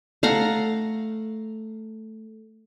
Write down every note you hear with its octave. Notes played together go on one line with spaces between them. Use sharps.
A3 F5 F#5 A#5